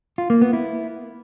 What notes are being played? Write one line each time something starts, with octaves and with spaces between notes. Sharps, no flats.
F4
A#3
B3
E4